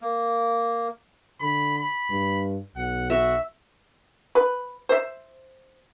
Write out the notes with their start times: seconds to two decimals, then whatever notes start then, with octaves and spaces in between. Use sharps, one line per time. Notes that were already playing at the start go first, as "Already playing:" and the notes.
0.01 A#3
1.41 D3 B5
1.78 B5
2.10 G2
2.76 B1 F#5
3.10 F#4 E5
4.35 B4
4.89 C5 E5